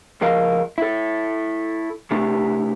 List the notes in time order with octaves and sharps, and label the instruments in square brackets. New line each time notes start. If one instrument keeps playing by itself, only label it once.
[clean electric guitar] C#2 F3 A#4 D#5 F5
E4 A4
C3 A3 D4 E4 G4